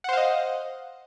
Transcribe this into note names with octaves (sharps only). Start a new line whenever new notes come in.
C5 D#5 F5 F#5